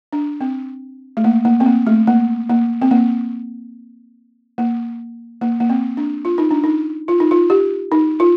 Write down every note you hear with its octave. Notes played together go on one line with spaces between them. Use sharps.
D4
C4
A3
A#3
A#3
C4
A#3
A3
A#3
A#3
C4
A#3
A#3
A#3
A#3
C4
D4
F4
D#4
D4
D#4
F4
D#4
F4
G4
D#4
F4